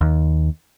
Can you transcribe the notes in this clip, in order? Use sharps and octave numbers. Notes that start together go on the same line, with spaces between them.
D#2